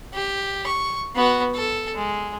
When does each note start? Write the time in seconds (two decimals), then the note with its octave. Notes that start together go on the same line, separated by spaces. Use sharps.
0.14 G4
0.66 C#6
1.15 B3 F#4
1.54 A4
1.95 G#3